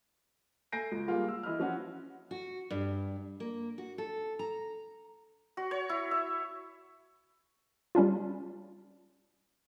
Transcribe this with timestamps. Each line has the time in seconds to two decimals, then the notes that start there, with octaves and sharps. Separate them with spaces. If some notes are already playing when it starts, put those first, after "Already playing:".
0.72 A3 G#5 G6 A#6 C7 D7
0.92 C#2
1.08 G3 A#3 F4 G#4
1.28 E6
1.43 E3 D#5 B5 F6
1.60 F3 C#4 F#4
2.31 F#4
2.71 G2
3.40 A#3
3.78 F#4
3.98 A4
4.39 A#5
5.57 F#4
5.71 C#5
5.89 E4
6.11 E5
7.95 G3 C#4 D4 F4